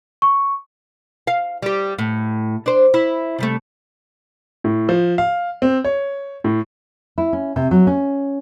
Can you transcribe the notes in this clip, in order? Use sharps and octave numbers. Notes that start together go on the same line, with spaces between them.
C#6
F5
G3 G4
A2
D4 C5
E4
C3 G3 A3
A2
F3
F5
C4
C#5
A2
E4
C#4
C3
F#3
C#4